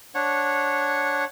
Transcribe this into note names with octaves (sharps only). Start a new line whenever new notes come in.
D4 C#5 F#5